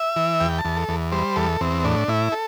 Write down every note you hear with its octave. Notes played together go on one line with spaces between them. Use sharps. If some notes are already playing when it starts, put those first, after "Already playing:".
Already playing: E5
E3
E2 G5
A5
E2
A4
E2
G3 C5
E2 A4
E2 C4
A2 D4
A2 E4
A4